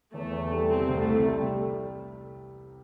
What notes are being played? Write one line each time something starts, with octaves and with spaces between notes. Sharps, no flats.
E2 A3
E2
G3
C3 C4
C2
A3
C3
G3